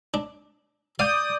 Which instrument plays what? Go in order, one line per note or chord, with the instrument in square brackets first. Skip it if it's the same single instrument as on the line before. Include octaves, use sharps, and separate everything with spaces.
[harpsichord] D4
[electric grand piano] D5 D6 G6 [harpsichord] F5 [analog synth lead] D#6